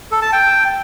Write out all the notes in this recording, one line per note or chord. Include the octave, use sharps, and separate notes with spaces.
A4
A5
G5